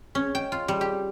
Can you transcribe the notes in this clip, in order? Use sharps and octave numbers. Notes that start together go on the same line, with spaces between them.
C#4
G5
F4
G3
G4